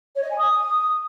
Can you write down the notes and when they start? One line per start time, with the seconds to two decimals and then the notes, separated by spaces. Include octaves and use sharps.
0.15 C#5
0.23 D#5
0.31 G#5
0.38 D#6